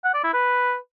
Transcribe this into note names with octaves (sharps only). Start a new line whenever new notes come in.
F#5
D5
E4
B4